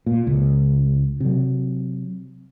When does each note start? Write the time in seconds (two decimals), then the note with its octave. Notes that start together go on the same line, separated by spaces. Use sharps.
0.06 A#2
0.27 C#2
1.20 C3 F#3